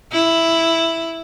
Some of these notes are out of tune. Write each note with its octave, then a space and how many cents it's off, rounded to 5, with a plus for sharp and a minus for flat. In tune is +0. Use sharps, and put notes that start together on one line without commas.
E4 +0